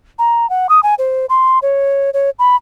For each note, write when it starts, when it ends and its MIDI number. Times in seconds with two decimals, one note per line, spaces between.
0.19 0.49 82
0.50 0.67 78
0.69 0.80 87
0.83 0.94 80
0.98 1.26 72
1.29 1.59 84
1.62 2.10 73
2.14 2.30 73
2.39 2.56 83